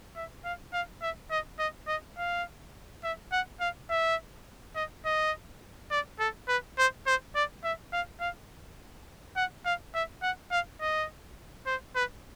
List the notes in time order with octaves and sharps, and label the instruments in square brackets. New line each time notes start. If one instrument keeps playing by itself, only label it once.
[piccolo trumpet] E5
F5
F5
E5
D#5
D#5
D#5
F5
E5
F#5
F5
E5
D#5
D#5
D5
A4
B4
C5
C5
D5
E5
F5
F5
F#5
F5
E5
F#5
F5
D#5
C5
B4